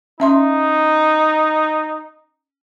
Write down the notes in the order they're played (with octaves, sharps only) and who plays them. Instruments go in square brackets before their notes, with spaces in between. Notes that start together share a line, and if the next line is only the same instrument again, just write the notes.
[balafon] C#4 E5 C6 [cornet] D#4